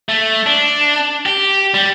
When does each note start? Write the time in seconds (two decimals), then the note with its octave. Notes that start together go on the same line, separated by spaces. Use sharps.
0.09 A3
0.46 D4
1.26 G4
1.74 G3